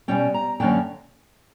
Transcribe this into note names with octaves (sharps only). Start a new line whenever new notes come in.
B2 G3 C#4 G5
A#5
F#2 D3 F#3 A#3 C#4 G5